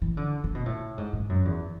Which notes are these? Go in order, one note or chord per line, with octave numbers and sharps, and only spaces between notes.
E3
D3
D3
B2
A2
G#2
G#2
F#2
E2